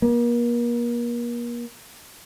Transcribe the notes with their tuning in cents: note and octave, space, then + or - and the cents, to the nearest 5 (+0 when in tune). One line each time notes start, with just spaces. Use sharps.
A#3 +40